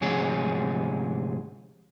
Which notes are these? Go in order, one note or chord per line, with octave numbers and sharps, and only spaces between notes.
D2 G#2 C3 F3 G#4 C#5